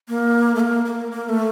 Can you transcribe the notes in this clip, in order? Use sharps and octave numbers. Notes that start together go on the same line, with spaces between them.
A#3
A3
A#3
A#3
A#3
A3